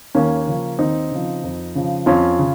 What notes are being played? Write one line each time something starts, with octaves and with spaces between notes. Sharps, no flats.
D#2 A#3 C#4
C#3 F3
D#2 C4 D#4
C#3 F3
F2
C#3 F3
F2 C#4 F4
C#3